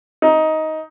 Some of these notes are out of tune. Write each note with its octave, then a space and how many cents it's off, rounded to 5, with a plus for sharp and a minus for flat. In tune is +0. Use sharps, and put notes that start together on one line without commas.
D#4 +15